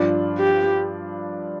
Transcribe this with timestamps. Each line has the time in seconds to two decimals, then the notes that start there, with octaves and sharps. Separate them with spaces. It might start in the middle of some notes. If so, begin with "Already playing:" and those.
Already playing: G2 F3 D4 F4
0.39 G4